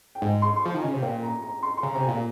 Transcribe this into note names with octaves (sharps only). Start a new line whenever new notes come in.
G5
G#2 G#5
C6
C6
F3 C#6
D#3
C#3 G#5
C3
A#2 G5
A#5
A#5
C6
C6
C#3 A#5
C3 A#5
G#5
A#2